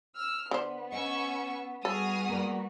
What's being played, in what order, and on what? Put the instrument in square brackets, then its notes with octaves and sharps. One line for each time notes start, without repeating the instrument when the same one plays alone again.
[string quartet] E6 F6
[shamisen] D3 C5 [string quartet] B3
[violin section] C#4 C#6 E6 [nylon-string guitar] D#5
[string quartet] G3 B3 F#4 [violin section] G#4 D#6 F6 [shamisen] A4
[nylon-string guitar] A#3 D5